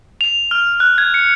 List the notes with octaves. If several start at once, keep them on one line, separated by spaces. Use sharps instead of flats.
F7
F6
F#6
G#6
C#7